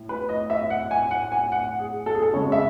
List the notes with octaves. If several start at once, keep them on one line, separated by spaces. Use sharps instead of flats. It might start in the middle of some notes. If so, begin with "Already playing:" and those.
Already playing: A2
B4
D#5
E5
F#5
G#5
F#5
G#5
F#5
G#4
A4
G#4
A4
C#3 G#3 C#5
E5